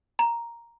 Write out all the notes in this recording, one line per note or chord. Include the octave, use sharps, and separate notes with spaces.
A#5